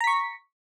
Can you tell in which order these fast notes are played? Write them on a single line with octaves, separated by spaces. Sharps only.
A#5 B6 C#6